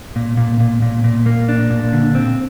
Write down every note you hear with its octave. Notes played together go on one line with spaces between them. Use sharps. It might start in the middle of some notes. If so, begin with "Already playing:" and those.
A#2
A#2
A#2
A#2
A#2
A#3
D4
A#2
D3
C4